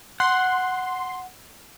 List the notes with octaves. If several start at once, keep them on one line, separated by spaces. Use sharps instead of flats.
F#5 C6